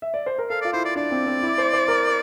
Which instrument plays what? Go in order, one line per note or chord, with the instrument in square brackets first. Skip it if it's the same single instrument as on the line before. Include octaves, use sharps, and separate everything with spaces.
[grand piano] E5
D5
C5
A#4
[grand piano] A4 [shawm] F5
[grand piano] F4 [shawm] D5
[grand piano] E4 [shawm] C5
[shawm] D5
[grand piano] D4 [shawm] D5
[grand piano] C4
C4
E4
C5
C5
A#4